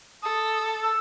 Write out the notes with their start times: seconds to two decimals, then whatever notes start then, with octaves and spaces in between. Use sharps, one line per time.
0.23 A4 D#6
0.83 E6